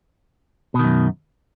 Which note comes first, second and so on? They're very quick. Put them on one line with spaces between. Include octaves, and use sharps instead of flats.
B2 D#3 F#2